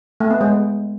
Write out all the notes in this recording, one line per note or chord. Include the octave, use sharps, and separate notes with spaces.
A3
B3
G#3